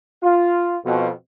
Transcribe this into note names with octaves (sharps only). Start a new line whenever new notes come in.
F4
F2 B2